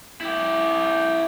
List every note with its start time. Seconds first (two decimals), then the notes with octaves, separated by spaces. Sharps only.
0.21 E4 G4